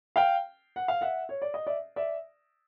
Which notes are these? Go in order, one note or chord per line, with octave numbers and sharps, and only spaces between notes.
F5 G5
F#5
F5
E5 F#5
C#5
D5
D#5
D5 E5
D5 E5